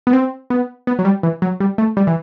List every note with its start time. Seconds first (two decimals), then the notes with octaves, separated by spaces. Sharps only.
0.07 B3
0.13 C4
0.50 B3
0.87 B3
0.99 F#3
1.05 G3
1.23 E3
1.42 F#3
1.60 G3
1.78 A3
1.97 G3
2.07 E3